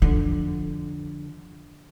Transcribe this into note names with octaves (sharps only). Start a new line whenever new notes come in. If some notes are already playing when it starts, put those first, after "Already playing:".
F2 D3